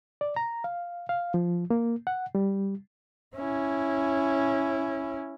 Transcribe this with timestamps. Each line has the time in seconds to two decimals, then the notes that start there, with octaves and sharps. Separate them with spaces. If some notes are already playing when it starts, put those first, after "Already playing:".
0.21 D5
0.36 A#5
0.64 F5
1.09 F5
1.34 F3
1.71 A#3
2.07 F#5
2.35 G3
3.36 C#4 E4